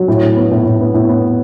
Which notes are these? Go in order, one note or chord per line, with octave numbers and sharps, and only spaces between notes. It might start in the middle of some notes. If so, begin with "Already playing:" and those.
Already playing: F#3
A2
A2
B3
A2
A2
B3
A2
B3